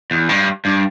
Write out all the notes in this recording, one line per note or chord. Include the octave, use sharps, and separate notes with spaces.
E2
G2
G2